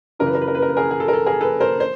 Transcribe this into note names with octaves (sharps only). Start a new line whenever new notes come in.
F#2 C#3 E3 A#4
B4
A#4
B4
A#4
B4
A#4
B4
G#4 A#4
G#4
A4
A#4
A4
G#4 A#4
A4 B4
A#4 C5
C5